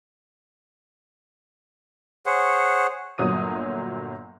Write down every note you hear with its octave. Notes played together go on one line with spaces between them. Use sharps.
G#4 C5 C#5 F#5
G1 A#2 F#3 D#6 D#7